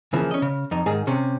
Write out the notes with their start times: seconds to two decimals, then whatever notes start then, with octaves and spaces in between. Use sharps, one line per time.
0.13 C#3 E3 F3 A#3
0.31 C#4 D#5
0.42 C#3
0.71 F2 D#4
0.86 G#2 D#3 G#4
1.07 C3 C#4